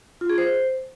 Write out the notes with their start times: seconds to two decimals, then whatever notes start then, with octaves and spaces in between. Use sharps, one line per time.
0.21 F4
0.30 G#4
0.38 C5